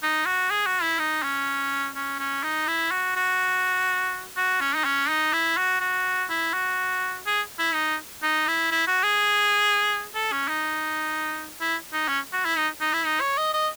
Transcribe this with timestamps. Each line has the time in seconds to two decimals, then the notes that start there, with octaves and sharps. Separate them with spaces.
0.03 D#4
0.26 F#4
0.51 G#4
0.66 F#4
0.82 E4
0.99 D#4
1.23 C#4
1.95 C#4
2.19 C#4
2.44 D#4
2.67 E4
2.91 F#4
3.16 F#4
4.37 F#4
4.61 C#4
4.76 D#4
4.85 C#4
5.10 D#4
5.33 E4
5.57 F#4
5.81 F#4
6.30 E4
6.53 F#4
7.26 G#4
7.59 E4
7.74 D#4
8.23 D#4
8.47 E4
8.71 E4
8.87 F#4
9.04 G#4
10.15 A4
10.32 C#4
10.48 D#4
11.61 E4
11.93 D#4
12.08 C#4
12.33 F#4
12.45 E4
12.57 D#4
12.81 D#4
12.93 E4
13.05 D#4
13.21 C#5
13.38 D#5
13.54 D#5